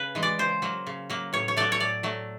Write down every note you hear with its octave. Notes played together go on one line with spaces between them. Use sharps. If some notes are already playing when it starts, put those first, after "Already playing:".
Already playing: C#3 B4
E3 G#3
D5
C#3 C5
F#3 A#3
C#3
F#3 A#3
A2 C#5
C#5
F#3 A3 D5
C#5
A2 D5
F#3 A3